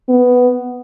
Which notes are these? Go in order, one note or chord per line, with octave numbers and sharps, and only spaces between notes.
B3